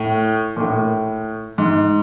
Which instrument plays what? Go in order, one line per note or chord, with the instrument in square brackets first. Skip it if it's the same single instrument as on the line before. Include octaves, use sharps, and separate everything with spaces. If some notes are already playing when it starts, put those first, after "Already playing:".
Already playing: [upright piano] A2
A#2
A2
G#2